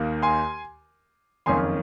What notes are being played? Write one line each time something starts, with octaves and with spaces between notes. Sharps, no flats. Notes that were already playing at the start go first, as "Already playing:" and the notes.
Already playing: D#2 D#3 A#3
G#5 C6
F#1 F2 D#3 A#3 C#4 G#5 C6